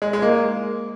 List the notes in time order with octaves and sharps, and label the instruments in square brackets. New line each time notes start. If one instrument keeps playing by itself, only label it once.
[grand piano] G#3
G#3
A#3